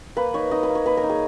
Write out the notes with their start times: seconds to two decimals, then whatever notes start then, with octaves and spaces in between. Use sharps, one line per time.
0.17 A#3 B4
0.34 D#4 C#5
0.51 D#4 D#5
0.63 B4
0.70 A#3
0.75 C#5
0.86 A#3 B4
0.97 A#4
1.03 D#4
1.10 G#4